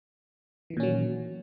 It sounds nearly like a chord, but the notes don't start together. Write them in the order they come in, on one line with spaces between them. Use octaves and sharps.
E3 D#3 A#2 C#4 F#3